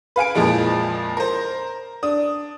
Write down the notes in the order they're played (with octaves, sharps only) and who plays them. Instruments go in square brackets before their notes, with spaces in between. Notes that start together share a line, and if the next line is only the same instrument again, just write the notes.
[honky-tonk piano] B4 F5 G#5 D7
F2 A#2 F3 G#3 E4
A#4 C5
D4 D#6